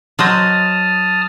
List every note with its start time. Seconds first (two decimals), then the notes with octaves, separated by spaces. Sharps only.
0.19 F#3 C5 D#5 A5 D#6 F6